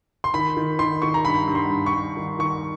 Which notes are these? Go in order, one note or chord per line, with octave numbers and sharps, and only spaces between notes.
C6
D#3 B5
D#3
D#3 C6
D#3 C#6
A#5
G2 B5
G2
C6
G2
C#6
G2
D#3
D#3 C#6